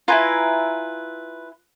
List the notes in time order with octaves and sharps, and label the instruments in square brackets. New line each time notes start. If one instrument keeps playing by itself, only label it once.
[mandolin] E4 G#5 A#5 [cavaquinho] F4 B4